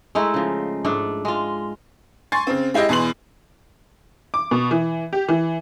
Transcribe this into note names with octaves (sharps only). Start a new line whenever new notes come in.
G#3 A3 D#4 E4
C#3 F3
G#2 A3 D4
G#3 F4
G#5 C6 C#6 A6
C#3 C4
G#3 E4 G4 D#5 E5
E2 B2 E3 C6 F#7
D6
B2
E3
G4
E3